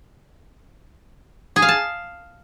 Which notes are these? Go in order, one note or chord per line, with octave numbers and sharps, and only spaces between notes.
G#4
F5
A5